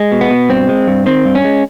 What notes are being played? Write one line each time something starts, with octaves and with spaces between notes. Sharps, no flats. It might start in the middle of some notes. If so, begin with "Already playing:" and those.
Already playing: G#3
B2
B3
B2
G2 C4
G#3
G2
D#3 C4
G2
C#4
G#3